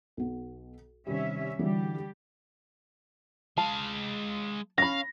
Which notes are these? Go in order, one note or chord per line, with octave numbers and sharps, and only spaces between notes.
B1 B3
C3 D#3 G3 C#4 E5
D3 E3 G3 F#4 G4
G#3 F5 A5
C#4 F5 B5 A#6